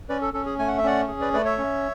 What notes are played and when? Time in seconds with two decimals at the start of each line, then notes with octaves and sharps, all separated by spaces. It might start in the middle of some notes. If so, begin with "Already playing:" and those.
0.09 C#4 B4 D5
0.21 A4
0.33 C#4 A4
0.46 G#4
0.59 A3 G#5
0.68 F#5
0.78 E5
0.83 C#4 D5 F#5
1.08 G#4
1.21 B4 D5
1.33 A3 B4 D5
1.45 C#5 E5
1.58 C#4